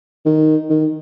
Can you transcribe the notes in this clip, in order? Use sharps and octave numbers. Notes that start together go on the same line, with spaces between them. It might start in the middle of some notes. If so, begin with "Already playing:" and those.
D#3
D#3